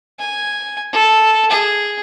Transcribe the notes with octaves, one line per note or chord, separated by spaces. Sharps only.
G#5
A4
G#4